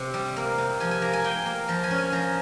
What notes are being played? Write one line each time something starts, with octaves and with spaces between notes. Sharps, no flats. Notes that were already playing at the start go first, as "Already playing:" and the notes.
Already playing: C3
G3
A#3
C3
F3 G#5
G#5
A#3 A#5
G#5
A#3 G5
A#3
F3 A#5
G#5
C#4
G#5
F3 A#5